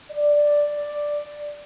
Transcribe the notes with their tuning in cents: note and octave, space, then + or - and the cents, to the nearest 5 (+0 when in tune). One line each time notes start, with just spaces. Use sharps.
D5 +5